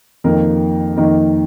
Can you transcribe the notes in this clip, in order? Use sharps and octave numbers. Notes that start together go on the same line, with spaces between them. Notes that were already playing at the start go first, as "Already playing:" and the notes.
F2 D#3 A#3 D#4 A#4
F2 D#3 A#3 D#4 A#4